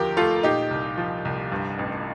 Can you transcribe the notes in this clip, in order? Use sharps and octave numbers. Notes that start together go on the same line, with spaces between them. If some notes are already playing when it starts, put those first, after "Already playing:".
Already playing: D#2 D3 F3 G4 A#4
A3 F4 A4
A#2 D#4 G4
C2
F3
C2
G2
A1